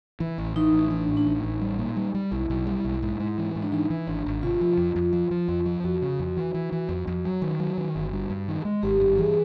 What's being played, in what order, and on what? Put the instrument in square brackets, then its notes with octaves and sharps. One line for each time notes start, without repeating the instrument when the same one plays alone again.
[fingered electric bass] E3
A1
[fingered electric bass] E3 [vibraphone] D#4
[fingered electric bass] A1
[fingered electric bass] E3 [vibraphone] D4
[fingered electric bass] A2
[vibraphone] D4
[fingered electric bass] A1 [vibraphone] D#4
[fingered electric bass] A1
G3
A#2
G3
G3
[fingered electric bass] B1 [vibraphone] E4
[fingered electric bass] B1
G3
B1
G#2
G#2
E3
G#2
[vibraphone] D4
[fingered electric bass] E3 [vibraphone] D#4
[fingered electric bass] E3
[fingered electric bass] G#1 [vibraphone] D4
[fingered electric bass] G#1
[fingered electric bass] C3 [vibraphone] F4
[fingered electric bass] F3
F2
F2
F3
F3
F2
F3
[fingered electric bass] F2 [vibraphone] F#4
[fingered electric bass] C#3
F2
E3
E3
E3
F2
F2
F#3
D#3
F#3
D#3
G1
G2
G2
D#3
G#3
[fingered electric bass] G#1 [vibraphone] G4
[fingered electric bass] G2 [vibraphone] G4
[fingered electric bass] E3 [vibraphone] G#4